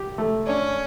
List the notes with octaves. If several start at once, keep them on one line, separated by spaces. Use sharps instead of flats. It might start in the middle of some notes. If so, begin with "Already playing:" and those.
Already playing: G4
A3
C#4 D4